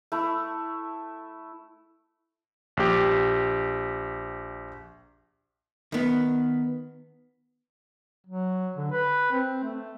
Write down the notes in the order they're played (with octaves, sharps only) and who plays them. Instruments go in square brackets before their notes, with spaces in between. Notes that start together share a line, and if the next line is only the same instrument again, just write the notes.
[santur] A3 E4
[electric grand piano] A#1 G4
[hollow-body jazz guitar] D#3 B3
[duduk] F#3
D3
B4
C4
A3